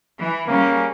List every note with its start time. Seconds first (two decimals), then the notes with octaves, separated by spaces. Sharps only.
0.18 E3
0.48 C#3 G3 A#3 C#4